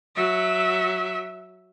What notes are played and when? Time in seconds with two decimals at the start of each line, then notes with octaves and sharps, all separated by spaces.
0.16 F#3 E5